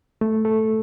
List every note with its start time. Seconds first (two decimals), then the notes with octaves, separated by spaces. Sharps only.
0.21 A3
0.45 A4